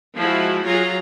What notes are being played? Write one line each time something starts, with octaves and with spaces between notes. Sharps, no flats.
F3 G#3 E4 F#4
F#3 F4 G#4 A#5